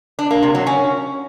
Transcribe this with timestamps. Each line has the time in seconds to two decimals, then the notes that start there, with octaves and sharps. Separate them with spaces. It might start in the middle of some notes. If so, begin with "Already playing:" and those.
0.19 D4
0.31 A#3
0.43 C3
0.55 F#3
0.67 C#4